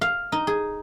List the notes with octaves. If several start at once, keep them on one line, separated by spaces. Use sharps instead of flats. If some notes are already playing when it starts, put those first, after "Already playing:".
F5
D#4
G#4